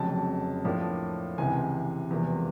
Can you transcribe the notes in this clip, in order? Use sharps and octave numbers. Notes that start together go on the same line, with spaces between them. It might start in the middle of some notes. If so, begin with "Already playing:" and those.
Already playing: F1 F2 C#3 F#3 A5
A2 F3 A#3 D4
C#2 C3 E3 G#5
E1 E2 C3 F3 A#3